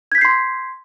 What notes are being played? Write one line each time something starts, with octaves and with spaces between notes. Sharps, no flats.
C6 G6 G#6 B6 C7